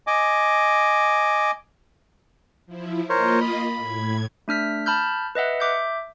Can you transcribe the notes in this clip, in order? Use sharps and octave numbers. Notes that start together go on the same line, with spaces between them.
D#5 G#5 D6
F3 E4
A#3 F4 A#4 C5 C#5 D#5
B5
A2 G#6
A3 D4 F6 B6
A5 B5 F6 G6
B4 D#5 E5 F#5
E5 D6 G6